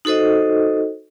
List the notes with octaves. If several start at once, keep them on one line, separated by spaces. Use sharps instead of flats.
D#4 F#4 A4 C5 D#5